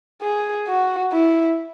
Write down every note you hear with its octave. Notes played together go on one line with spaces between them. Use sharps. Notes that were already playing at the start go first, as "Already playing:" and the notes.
G#4
F#4
E4